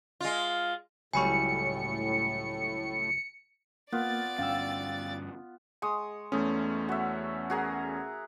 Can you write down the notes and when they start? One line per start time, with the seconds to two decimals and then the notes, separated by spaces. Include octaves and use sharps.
0.21 G#3 F4
1.13 C#2 A2 F#3 G3 G#5 B5 C#6 C#7
3.92 A#3 B3 F4 D5 A6
4.38 G1 G2 C#4 F5 G5 E6
5.82 G#3 C#6 D#6
6.32 E2 A3 C#4 D#6
6.89 F#4 E5
7.50 F#4 G#4 A#4